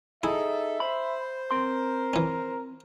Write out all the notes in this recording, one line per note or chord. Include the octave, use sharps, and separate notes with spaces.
D#4 E4 G#4 A4 E5
C5 B5
C4 A#4 C6
E3 C#4